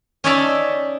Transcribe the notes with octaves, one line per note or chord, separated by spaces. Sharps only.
C#4 D#4 C#5 D5 E5 A5